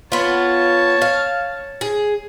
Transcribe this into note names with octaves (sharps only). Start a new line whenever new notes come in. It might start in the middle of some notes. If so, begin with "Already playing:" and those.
B3 F4 C#5 A5
F5
G#4